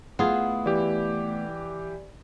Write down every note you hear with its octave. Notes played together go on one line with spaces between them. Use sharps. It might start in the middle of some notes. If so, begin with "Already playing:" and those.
A3 B3 E4 F4 G#4 F#5 D#6
E3 G4 D5